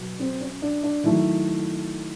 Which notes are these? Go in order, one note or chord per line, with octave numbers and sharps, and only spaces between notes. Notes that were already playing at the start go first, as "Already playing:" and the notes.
Already playing: B2 F#3
C4
C#4
D4
D4
D#3 F#3 A3 E4